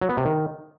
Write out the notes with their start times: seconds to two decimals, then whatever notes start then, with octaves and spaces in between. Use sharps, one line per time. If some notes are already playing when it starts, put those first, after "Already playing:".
0.01 F#3
0.09 B3
0.17 C3
0.25 D#3